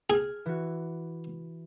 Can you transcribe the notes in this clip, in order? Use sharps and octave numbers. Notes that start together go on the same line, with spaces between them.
G#4 F6 G#6
E3 F#4